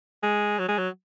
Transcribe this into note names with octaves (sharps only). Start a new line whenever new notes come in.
G#3
F#3
G#3
F#3